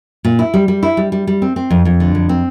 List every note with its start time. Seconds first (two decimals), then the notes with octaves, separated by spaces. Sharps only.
0.25 A#2
0.39 E4
0.54 G3
0.68 G3
0.83 E4
0.97 G3
1.12 G3
1.27 G3
1.42 C4
1.56 C4
1.70 F2
1.85 F2
2.00 D3
2.15 F2
2.29 C4